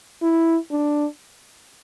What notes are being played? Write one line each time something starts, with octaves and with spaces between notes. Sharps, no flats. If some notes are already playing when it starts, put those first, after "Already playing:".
E4
D4